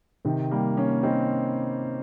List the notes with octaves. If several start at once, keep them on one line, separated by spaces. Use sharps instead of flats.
C3 D#3
G3 A#3
A#3 C#4
C4 D#4